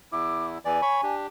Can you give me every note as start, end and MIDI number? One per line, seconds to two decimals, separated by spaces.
0.12 0.58 40
0.12 0.58 64
0.12 0.46 86
0.65 0.81 40
0.65 0.81 52
0.65 0.81 74
0.65 1.14 80
0.82 1.01 73
0.82 1.01 83
0.82 1.01 85
1.03 1.27 62
1.03 1.27 67